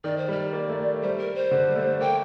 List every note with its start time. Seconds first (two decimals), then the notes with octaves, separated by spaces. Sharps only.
0.04 D#3 D5
0.18 C5
0.28 G3 D5
0.53 A#3
0.69 A3
1.02 G3 C5
1.19 A#4
1.35 C5
1.51 D3
1.69 G3
1.76 A3
2.00 A#3 G5